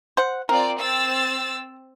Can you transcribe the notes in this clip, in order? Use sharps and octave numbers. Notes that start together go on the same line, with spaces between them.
C5 F#5
C4 F4 A#4 D5
C4 E6 A6